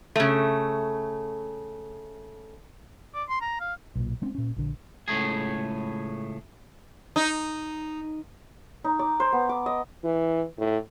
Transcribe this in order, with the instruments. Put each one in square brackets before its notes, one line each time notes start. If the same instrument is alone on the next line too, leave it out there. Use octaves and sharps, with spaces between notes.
[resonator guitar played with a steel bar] C#3 A3
[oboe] D5
C6
A#5
F5
[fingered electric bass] B1 A#2
G#3 C4 C#4
A#2 C#4
A#1 D3
[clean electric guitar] C#2 A2 A3 G#4
[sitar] D#4
[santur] D#4
D5
C5
B3
D6
D#5
[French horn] E3
A2